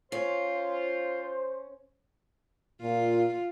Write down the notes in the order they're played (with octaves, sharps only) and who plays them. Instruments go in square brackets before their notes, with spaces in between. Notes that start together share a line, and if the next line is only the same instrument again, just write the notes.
[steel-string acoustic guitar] C#4 [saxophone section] F4 [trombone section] C5
[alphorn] A#2 [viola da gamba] F4